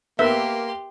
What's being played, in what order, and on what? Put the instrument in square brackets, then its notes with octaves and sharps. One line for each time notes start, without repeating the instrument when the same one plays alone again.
[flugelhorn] A#3 [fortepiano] B3 A#4 [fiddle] G4 C6 [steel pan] E5